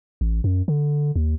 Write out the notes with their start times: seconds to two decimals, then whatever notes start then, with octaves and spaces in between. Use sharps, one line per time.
0.21 A1
0.44 F#2
0.68 D3
1.16 D#2